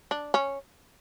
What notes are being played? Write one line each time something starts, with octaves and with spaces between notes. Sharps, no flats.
D4
C#4